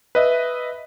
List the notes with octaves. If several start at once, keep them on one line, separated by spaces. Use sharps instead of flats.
B4 D#5 E5